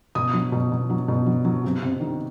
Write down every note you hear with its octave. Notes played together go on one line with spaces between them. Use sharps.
B2 D#6
F#3
B2
B2
F#3
B2
F#3
F#3
C3
C3
D#3